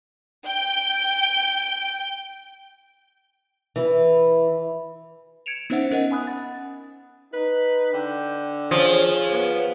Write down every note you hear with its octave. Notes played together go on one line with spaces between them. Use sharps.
G5 G6 D7
E3
G#6 C#7 D7 E7 F7
B3 C#4 D#4 C5 E5 F#5
C#4 A#4 D#5 F#5
G#5 B5 D#6 F#6
F#5 A6
D#4 B4
D3 G5
F3 G#4 C#5
B3